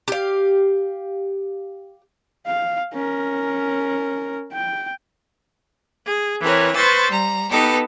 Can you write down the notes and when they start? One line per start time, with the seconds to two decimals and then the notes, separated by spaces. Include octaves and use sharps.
0.08 G4 F5
2.46 F5
2.94 C#4 A#4
4.52 G5
6.07 G#4
6.41 E3 C4 A#4 B4 C#5
6.75 B4 C5 C#6 E6 A6
7.10 G3 A#5
7.51 B3 D#4 G4 A4 B4